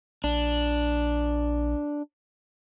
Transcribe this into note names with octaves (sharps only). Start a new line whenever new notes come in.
A#1 D4